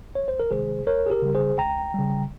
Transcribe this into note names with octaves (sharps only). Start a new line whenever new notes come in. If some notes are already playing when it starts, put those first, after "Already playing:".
C2 C#5
C5
A#4
C3 D#3 G#3 G#4 C5
C#2 A#4 C#5
G#4
G4 A#4
C#3 G3
G#4 C5
C#2 G5 A#5
C#3 G3